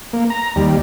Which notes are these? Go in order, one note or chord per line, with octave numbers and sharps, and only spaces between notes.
A#3
A#5
D#2 G3